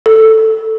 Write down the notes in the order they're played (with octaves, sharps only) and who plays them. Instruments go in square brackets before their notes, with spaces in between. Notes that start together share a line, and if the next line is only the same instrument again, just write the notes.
[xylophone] A4